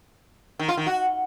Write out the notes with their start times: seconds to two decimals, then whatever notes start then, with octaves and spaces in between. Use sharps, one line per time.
0.59 D#3
0.68 F4
0.77 D#3
0.86 F#4